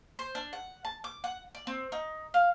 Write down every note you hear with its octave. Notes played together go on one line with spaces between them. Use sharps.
C5
D4
F#5
A5
D6
F#5
D5
C4
D#4
F5